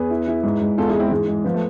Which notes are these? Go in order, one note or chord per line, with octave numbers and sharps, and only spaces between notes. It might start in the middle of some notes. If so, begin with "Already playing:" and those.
Already playing: E2 G#4 B4
E4
E4
G#2
G#2
E2 F4 A4
E4 G#4
G#3
C4 E4
G#2 E3 G#3
G#2
F3 B3
A3